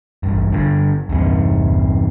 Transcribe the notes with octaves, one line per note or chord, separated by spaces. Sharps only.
A1 G2
G2 D3
E2 G2 C3